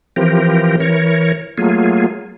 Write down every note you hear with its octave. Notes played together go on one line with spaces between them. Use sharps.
E3 F3 C4 G4 A#4
E3 A#4 C#5
F#3 A3 A#3 F4 G#4